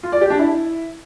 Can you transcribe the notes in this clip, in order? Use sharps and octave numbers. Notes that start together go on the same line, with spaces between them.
F4
D5
G4
D4
E4